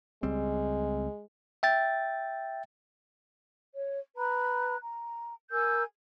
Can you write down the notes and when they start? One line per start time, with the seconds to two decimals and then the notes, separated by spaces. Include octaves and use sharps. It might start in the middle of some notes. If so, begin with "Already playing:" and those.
0.23 C#2 G3 G#3 C4
1.63 E5 G5 A6
3.73 C#5
4.17 B4 A#5 B5 F#6
4.81 A#5
5.51 A#4 G#5 E6 G6